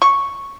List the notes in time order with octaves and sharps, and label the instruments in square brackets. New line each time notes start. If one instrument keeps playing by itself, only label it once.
[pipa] C#6